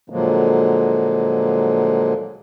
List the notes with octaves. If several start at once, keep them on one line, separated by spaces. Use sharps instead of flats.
A#2 D3 F3 F#3 G#3 A#3